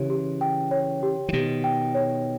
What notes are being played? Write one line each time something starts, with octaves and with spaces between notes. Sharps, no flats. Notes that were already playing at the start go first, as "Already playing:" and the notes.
Already playing: C#3 E3 G4 C#5
G4
G5
C#5
G4
E3
B2 D#3 G4
G5
C#5